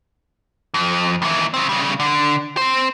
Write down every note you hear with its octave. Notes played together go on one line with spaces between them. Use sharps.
F2
D#2 E3
C#3 C4
C#3 G3
D3
C4 C5